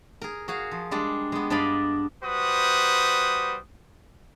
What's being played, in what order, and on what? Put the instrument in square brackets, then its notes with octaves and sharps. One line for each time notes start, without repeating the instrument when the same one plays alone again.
[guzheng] G#4 A#4
F#4 G#4 F5
F3
G3 G#3 D4
G#3 B3
G2 D4 D5 D#5 F5 B5
[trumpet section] G3 F#4 B4 C5 D#6